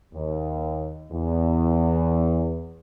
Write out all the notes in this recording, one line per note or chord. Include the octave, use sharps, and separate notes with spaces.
D#2
E2